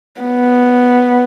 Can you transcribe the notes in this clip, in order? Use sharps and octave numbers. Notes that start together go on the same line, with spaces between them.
B3